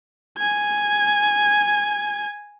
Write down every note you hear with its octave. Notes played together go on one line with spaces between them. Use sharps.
G#5 G#6